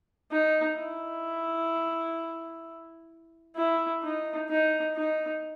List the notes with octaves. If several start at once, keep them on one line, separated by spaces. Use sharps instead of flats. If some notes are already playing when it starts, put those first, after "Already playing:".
D#4
E4
E4
D#4
D#4
D#4